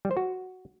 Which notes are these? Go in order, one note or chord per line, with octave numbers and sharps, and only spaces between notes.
G3
C5
F#4